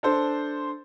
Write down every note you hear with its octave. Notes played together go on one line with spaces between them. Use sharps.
D4 A4 C5